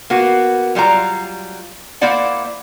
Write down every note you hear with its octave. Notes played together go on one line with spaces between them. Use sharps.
A#3 B3 F#4
F#3 G3 F4 A#5
A#3 E4 C5 D5 F#5